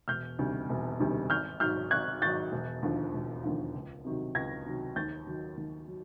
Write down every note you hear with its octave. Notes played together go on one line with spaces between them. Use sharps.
E1 F6 G6
D2 C3 D#3 G3
E1
D2 C3 D#3 G3
G#1 F6 G6
G#2 D#3 F#3 F6 G6
G#1 F#6 G#6
G#2 D#3 F#3 G6 A6
E1
D#2 D3 F3
E1
D#2 D3 F3
C#2
C3 D#3 F#3
C#2 G#6 A#6
C3 D#3 F#3
D#2 G6 A6
D#3 F#3
D#2
F#3